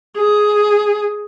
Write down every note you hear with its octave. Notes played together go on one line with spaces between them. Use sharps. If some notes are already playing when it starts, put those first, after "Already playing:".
G#4